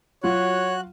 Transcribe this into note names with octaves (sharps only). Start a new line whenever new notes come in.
F#3 F4 F#4 C#5 F#6